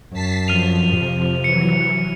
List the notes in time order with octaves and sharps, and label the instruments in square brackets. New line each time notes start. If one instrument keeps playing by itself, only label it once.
[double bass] F#2 [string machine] A5 B6 C7
[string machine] F2 F3 [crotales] F6 D#7 F7
[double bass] C3
[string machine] E3 F#3 [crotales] C#7